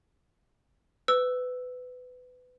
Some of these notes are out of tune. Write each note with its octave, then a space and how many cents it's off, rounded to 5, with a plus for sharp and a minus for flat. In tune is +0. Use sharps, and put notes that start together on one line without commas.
B4 +25 E6 +0